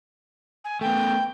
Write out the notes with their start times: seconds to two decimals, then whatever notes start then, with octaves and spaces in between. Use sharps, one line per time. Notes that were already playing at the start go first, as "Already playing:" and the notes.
0.64 G#5
0.81 A3 B3 G5